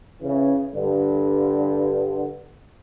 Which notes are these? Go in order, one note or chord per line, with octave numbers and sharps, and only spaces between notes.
C#3 E3
G2 D3